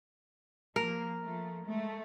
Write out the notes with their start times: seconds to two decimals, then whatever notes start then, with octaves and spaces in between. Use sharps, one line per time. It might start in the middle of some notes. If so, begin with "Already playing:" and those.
0.76 F3 A#3 A#4
1.23 F3 A3
1.65 G#3 A3